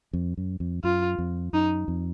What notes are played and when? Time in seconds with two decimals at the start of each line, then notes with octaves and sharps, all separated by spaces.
0.13 F2
0.38 F#2
0.60 F2
0.84 F#2 F4
1.19 F2
1.53 F#2 D#4
1.88 F2